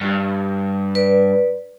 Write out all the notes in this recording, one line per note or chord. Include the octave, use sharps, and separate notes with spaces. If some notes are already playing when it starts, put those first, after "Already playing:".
G2
B4 D5